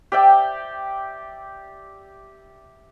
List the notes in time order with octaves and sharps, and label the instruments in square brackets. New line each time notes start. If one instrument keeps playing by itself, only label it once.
[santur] G4 D5 E5 G5